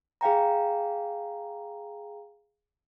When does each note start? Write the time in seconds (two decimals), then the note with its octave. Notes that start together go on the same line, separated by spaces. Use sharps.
0.21 G#4 F5 G5 A#5